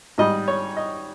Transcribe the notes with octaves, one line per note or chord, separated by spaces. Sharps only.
G#2 G3 D#5
C#5
D#5